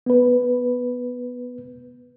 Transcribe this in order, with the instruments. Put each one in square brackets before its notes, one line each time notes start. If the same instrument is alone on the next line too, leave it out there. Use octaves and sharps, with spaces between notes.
[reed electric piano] B3 B4